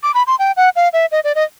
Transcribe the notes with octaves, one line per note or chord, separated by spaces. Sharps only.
D6
B5
C6
G5
F#5
F5
E5
D#5
D5
D#5